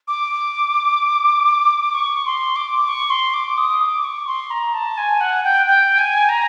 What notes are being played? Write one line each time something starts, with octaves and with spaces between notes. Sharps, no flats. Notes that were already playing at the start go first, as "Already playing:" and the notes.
D6
C#6
C6
D6
D6
C#6
C6
D6
D#6
D6
C#6
C6
A#5
A5
G#5
F#5
G5
G5
G#5
A#5